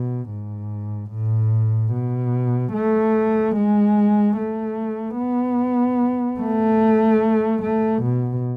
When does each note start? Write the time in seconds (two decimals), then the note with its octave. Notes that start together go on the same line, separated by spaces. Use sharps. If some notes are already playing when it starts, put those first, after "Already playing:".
Already playing: B2
0.29 G#2
1.11 A2
1.93 B2
2.73 A3
3.56 G#3
4.37 A3
5.18 B3
6.40 A3
7.63 A3
8.03 B2